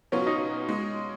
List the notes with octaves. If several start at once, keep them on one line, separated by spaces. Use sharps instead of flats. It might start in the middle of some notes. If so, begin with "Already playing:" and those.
B2 F#3 B3 C#4 F4
D#4
G#3